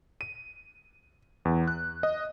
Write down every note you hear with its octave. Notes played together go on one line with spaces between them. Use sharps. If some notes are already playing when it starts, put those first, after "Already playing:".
D#7
E2
F#6
D#5